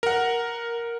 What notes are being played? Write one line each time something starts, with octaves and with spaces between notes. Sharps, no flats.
A#4 F#5